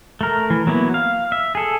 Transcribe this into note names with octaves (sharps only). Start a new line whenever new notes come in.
A3 A#4
E3
F#3 A#3 B3 E4
F5
E5
G#4 A4